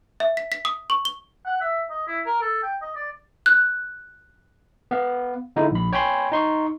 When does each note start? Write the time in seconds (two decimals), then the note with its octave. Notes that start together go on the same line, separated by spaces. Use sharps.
0.20 E5
0.37 B6
0.52 B6
0.65 D#6
0.90 C#6
1.05 G7
1.45 F#5
1.61 E5
1.90 D#5
2.07 E4
2.26 A#4
2.41 A4
2.63 G5
2.82 D#5
2.95 D5
3.46 F#6
4.91 B3 F5
5.56 D3 G#3 D#4 E4
5.71 A#1 B5
5.93 C#5 G5 G#5 B5 C6
6.32 D#4 C6 C#6